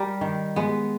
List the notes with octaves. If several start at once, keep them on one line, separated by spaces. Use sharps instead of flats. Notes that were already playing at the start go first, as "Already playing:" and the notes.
Already playing: G3 A#4
D#3
G#3 B3